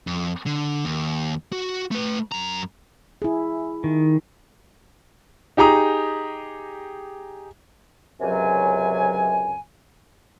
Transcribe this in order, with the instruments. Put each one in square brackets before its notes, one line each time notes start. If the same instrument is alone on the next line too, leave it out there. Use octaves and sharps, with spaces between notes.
[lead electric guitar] F2
D3
D#2
F#4
A3 B4
F#2 A#5
[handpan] E4 G#4
[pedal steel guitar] D#3
[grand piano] D#4 G4 G#4 A#5 D#6
[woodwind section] C#2 F#2 C3 F#3 G#5